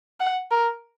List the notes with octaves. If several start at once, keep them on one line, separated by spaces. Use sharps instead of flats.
F#5
A#4